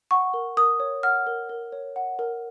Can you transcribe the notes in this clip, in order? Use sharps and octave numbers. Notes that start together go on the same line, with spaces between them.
F#5 C#6
A#4
A#4 D#6
C#5
F#5 F6
A#4
A#4
C#5
F#5
A#4